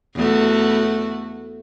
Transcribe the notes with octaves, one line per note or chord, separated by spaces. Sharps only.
E2 A3 F#4